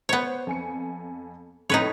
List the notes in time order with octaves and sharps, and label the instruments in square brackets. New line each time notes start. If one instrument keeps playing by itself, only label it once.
[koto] B3 C#5 [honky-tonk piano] C5 F#5
[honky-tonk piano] F2 G#5 C#7
[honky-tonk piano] F2 A2 [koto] D#4 B4 C#5